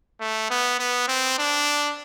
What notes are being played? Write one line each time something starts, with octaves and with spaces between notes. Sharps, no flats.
A3
B3
B3
C4
D4